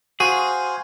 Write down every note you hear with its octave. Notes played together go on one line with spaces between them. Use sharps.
F#4 G#4 C5 F5 G#5